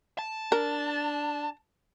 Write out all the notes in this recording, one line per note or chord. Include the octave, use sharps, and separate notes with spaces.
A5
D4 A#4